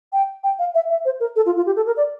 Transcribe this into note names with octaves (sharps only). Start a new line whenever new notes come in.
G5
G5
F5
E5
E5
C5
A#4
A4
F4
F4
G4
A4
A#4
D5